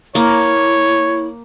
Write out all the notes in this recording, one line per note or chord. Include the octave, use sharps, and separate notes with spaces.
A#3 E4 C#5